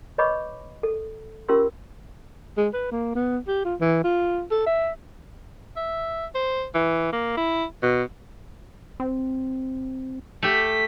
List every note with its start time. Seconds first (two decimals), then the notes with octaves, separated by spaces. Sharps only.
0.18 B4 C#5 D#5 B5 C#6 D6
0.83 A4
1.49 C#4 F4 G4 A#4 C6 E6
2.57 G#3
2.73 B4
2.91 A#3
3.15 B3
3.48 G4
3.65 F4
3.80 E3
4.04 F4
4.51 A4
4.67 E5
5.76 E5
6.35 C5
6.75 E3
7.13 A#3
7.37 E4
7.83 B2
9.00 C4
10.43 A3 G4 B6